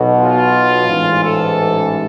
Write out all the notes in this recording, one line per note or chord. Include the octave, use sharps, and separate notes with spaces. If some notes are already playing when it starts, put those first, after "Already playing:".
Already playing: B1 B2
F4
A1 G#2 E3
A4